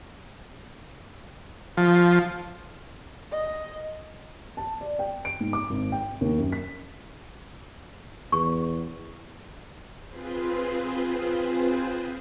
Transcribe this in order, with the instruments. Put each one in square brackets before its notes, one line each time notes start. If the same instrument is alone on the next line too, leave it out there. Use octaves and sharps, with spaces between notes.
[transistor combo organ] F3
[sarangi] D#5
[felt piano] A5
D5
G5
D7
G#2
D6
G#1
G5
D#2
F#2
B6
[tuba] E2 [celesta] C#6
[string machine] C4 F4 G#4 B4 C5